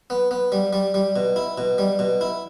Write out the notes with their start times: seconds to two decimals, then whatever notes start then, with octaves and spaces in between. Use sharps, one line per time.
0.10 B3
0.31 B3
0.52 G3
0.73 G3
0.94 G3
1.16 B2
1.36 E4
1.58 B2
1.78 G3
1.99 B2
2.21 E4